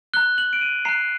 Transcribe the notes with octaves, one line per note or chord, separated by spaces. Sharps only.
A#5 F#6 G7
F#7
D7
D#7
A#5 F#6 C7